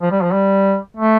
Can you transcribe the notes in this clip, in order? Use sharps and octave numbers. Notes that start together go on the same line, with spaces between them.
F3
G3
F3
G3
A3